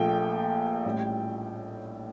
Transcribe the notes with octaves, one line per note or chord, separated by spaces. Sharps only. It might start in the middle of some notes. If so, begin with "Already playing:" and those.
Already playing: A#1 A#2 F3 A3 G5
A1 A2 G3